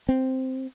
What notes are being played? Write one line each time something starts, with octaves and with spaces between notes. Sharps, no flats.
C4